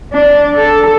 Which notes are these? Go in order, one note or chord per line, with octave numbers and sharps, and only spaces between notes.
D4
A4